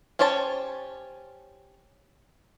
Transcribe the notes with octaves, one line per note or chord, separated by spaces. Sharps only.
C#4 G4 C5 C#5 A5